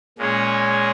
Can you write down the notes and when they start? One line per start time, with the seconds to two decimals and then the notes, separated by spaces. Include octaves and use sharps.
0.18 A#2 G#3 C#4 G#4 C#5